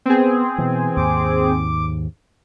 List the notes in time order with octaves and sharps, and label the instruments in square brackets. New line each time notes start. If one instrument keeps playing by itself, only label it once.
[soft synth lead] B3 [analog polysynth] C4 G#4
[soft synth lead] B2 [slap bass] E3
[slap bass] D#2 G#2 [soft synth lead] D6